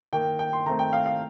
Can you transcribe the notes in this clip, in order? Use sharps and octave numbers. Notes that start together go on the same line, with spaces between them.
D#3 A#3 G5
G5
C6
D#3 A3 C4 A#5
G5
F5
F5